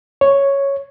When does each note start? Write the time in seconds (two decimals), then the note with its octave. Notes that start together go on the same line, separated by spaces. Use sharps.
0.21 C#5